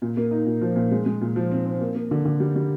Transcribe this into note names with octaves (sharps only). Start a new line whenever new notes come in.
A#2
A#3
D#4
A#2
F3
A#2
G#3
G#3
A#2
F3
C4
C4
A#3
A#3
D3
D3
G3
G3